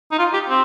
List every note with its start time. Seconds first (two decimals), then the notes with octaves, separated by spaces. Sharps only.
0.12 D#4
0.19 F4
0.33 G4
0.49 C4